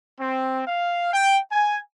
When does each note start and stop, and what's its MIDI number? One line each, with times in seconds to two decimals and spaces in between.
0.20 0.62 60
0.66 1.12 77
1.13 1.37 79
1.51 1.79 80